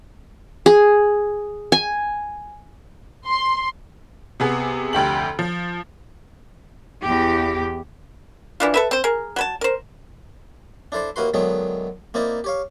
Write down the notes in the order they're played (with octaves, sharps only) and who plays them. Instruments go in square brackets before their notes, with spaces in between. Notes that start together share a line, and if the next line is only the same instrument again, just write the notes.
[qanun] G#4
G#5
[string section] C6
[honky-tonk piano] C3 B3 G#4
F1 D2 G4 F#7
F3
[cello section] E2 G4
[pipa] E3 D4 F4
A4 B4 E5
C4 C5
G#4 A#4
F#3 B4 A5
A#4 C5
[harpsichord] D4 E4 A4 C5 D5
D#2 A#3 E4 F#4 B4 C6
D3 D#3 F#3 G#3 B3 E4
A#3 C4 D#4 E4 D5
G4 C#5 F5